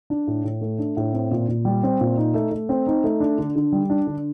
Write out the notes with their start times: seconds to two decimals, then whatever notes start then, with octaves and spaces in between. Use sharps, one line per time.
0.10 D4
0.27 A2
0.44 A2
0.61 A3
0.79 D4
0.97 A2
1.13 C4
1.31 A#2
1.48 A#2
1.65 G3
1.83 C4
2.01 A#2
2.17 D#4
2.34 A3
2.51 A3
2.69 C4
2.87 D#4
3.04 A3
3.20 D4
3.38 D3
3.56 D3
3.72 G3
3.90 D4
4.07 D3